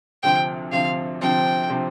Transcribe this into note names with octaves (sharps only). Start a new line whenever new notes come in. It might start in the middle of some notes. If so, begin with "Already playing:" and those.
D2 C3 F3 C4 G5
D2 C3 F3 C4 F5
D2 C3 F3 C4 G5
C3 F3 C4